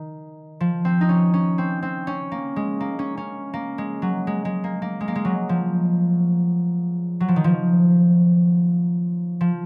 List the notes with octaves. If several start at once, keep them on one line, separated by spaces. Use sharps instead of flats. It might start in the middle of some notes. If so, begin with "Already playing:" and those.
Already playing: D#3
F3
C4
D#4
C#4
C#4
C4
C4
C#4
A#3
G#3
A#3
C#4
C#4
A#3
G#3
F#3
G#3
G#3
A#3
A#3
G#3
A#3
G#3
F#3
F3
F#3
F3
D#3
F3
F3